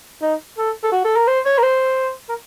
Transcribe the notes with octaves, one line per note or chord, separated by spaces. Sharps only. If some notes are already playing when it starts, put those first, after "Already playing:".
D#4
A4
A4
F#4
A4
A#4
C5
C#5
A#4
C5
A#4